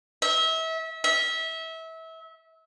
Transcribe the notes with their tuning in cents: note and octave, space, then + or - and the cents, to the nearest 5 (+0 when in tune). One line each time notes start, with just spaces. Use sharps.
E5 -30
E5 -25